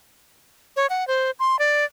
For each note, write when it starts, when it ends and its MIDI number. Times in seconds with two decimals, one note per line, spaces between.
0.76 0.86 73
0.90 1.07 78
1.08 1.31 72
1.39 1.58 84
1.59 1.84 74